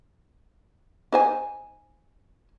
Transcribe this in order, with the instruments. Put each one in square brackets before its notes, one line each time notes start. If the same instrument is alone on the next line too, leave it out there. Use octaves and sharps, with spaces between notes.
[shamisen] D#4 C5 G#5